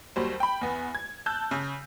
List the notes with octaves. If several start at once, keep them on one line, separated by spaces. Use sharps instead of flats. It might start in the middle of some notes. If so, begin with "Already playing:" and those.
D#2 F#3 G3 C5
G5 B5
E2 B3
G#6
A5 E6 F#6 G6
C#3